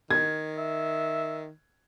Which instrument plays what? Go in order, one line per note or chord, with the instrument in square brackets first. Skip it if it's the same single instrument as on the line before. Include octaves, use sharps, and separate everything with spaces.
[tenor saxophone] D#3 [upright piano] G#6
[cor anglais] E5